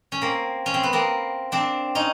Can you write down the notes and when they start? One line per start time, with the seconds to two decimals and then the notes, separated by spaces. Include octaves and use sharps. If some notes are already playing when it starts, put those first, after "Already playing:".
0.12 C#4
0.22 A#3 C4
0.66 C#4
0.74 C4
0.83 B3
0.93 A#3 C4
1.52 C4 D4
1.95 C#4 D#4